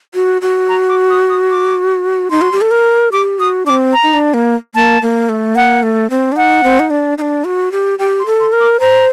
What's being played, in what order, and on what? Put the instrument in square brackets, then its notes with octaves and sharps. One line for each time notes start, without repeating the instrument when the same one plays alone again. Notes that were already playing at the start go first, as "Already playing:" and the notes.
[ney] F#4
F#4
[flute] A#5
D6
D#6
D#6
D6
[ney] D#4 [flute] C6
[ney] F#4
G4
A4
A#4
[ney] G4 [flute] D6
[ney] F#4 [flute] D#6
[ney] C4 D4 [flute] D6
[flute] A#5
[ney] D#4
D4
A#3
[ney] A#3 [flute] A5
[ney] A#3
A3
[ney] A#3 [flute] F#5
[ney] A3
C4
D4
[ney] D#4 [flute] F#5
[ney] C4
D#4
D4
D#4
D4
F#4
G4
[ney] G4 [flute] G5
[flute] C6
[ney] A4
[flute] C6
[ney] A#4
[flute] D6
[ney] C5 [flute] A#5